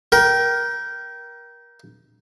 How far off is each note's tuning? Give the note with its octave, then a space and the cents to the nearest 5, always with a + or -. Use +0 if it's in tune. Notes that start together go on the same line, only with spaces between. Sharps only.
A#4 +25 G5 -20